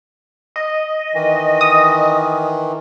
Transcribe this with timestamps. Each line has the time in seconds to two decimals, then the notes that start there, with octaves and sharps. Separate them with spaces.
0.56 D#5
1.14 D#3 E3
1.61 D#6